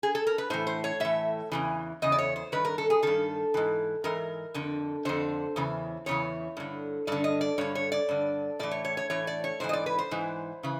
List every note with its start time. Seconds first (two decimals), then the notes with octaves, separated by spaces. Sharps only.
0.03 G#4
0.15 A4
0.27 A#4
0.38 B4
0.50 A2 E3 C5
0.67 C5
0.84 C#5
1.00 A2 E3 E5
1.52 E2 C#3 E3
2.02 E2 C#3 D#5
2.12 D5
2.18 C#5
2.36 C5
2.52 G2 D#3 B4
2.65 A#4
2.78 A4
2.90 G#4
3.03 G2 D#3 A4
3.54 G#2 E3
4.04 G#2 E3 A#4
4.54 F2 D3
5.05 F2 D3 C5
5.56 E2 C#3 E3
6.06 E2 C#3 E3 C#5
6.57 G2 D3
7.07 G2 D3 D5
7.24 D#5
7.41 D5
7.58 G2 D3 C#5
7.75 C#5
7.92 D5
8.09 G2 D3
8.59 A2 E3 D5
8.71 C#5
8.85 C#5
8.97 C#5
9.10 A2 E3 C#5
9.27 D5
9.44 C#5
9.60 G#2 E3 C5
9.69 D#5
9.73 D5
9.86 B4
9.98 C5
10.11 G#2 E3
10.63 C#3 E3